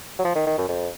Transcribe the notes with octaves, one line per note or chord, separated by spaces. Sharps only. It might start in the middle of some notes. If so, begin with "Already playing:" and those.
F#3
F3
D#3
D#3
F#2
F2